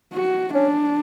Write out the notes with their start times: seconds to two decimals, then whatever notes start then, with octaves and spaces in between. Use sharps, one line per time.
0.14 F#4
0.54 C#4 D4